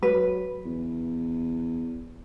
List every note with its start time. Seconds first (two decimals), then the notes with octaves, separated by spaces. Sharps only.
0.03 F#3 B4
0.65 E2